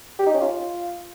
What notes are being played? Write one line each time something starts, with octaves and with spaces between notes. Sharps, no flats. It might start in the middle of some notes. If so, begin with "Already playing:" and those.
G4
D#4
C#4
F4